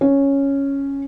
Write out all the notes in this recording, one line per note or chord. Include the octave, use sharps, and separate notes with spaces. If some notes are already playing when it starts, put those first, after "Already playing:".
C#4